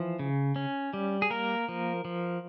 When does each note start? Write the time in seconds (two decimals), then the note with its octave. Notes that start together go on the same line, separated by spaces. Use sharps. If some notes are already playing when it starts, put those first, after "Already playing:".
Already playing: E3 F3
0.19 C#3
0.56 C#4
0.94 G3
1.22 G#4
1.30 A#3 A#4
1.68 F3
2.05 F3